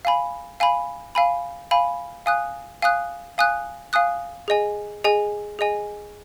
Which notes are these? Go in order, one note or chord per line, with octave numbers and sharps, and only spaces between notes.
F5 G#5 B5
F5 G#5 B5
F5 G#5 B5
F5 G#5 B5
F5 G#5 D#6 F#6
F5 G#5 D#6 F#6
F5 G#5 D#6 F#6
F5 G#5 D#6 F#6
G#4 D#5 G#5
G#4 D#5 G#5
G#4 D#5 G#5